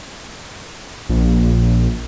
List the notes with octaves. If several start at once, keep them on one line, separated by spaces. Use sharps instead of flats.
A#1